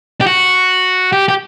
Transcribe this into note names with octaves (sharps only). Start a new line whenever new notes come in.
G4
F#4
G4
G4